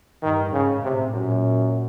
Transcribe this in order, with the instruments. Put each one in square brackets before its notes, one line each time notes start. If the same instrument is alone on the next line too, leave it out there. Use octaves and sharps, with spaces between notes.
[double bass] G2 [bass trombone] D#3
[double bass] G#2 [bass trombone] C#3
[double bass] A2 [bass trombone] C3
[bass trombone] F#2 [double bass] A#2